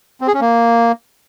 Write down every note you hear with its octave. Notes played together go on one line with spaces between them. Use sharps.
C4
G#4
C#4
A#3